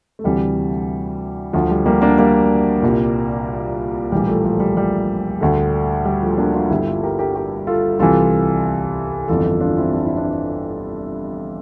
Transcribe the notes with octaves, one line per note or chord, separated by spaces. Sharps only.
A3
D2 C3 E3 G3
D2 D3 F3
G3
G3 A#3
A#3 D4
G3 A#3
C2 A#2
A#1 A2 E3 G3
F3 A3
F3 A3
G3
G3
D2 D3
G3
F3 A3
A#3 D4
D4 F4
G1 G2 D3 E4 G4
F4 A4
G4 A#4
G4 A#4
G4 A#4
F4 A4
C2 C3 E3 F4 A4
G1 F2 E3 F4 A4
D4 F4
C4 E4
D4
E4
D4